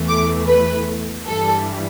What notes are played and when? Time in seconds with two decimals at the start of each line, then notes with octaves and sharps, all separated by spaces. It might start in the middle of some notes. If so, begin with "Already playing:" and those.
Already playing: E2 E3 A3
0.08 D6
0.48 B4
1.27 G2 E3 G3 A4